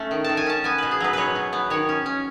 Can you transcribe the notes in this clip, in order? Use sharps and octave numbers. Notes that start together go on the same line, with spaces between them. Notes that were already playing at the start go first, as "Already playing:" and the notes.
Already playing: A3 C#4
D#3
D#3 A5
G#5
C#4 A5
B3 G#5
B2 B4
G#4
F#3 B4
B2 B4 C#5
B2
B3
D#3 C#5
C#4
C#4